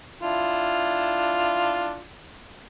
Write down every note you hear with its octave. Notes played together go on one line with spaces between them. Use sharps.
D4 E4 F4